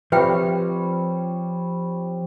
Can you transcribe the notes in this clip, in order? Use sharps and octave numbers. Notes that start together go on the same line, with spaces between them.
F3 G3 C4 B4 C#5 E5 G5